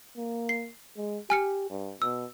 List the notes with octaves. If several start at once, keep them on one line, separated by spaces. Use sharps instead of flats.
A#3
C7
G#3
G4 G#5 F6 C#7
G2
B2 E6